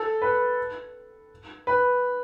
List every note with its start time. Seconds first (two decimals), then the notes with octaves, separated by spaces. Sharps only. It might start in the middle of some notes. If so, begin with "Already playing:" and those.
Already playing: A4
0.22 B4
1.67 B4